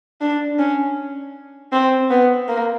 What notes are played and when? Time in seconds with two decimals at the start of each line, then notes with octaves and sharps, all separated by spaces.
0.21 D4
0.59 C#4
1.72 C4
2.11 B3
2.48 A#3